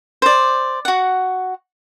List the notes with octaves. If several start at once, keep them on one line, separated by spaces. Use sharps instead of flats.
C5 D5
F#4 F#5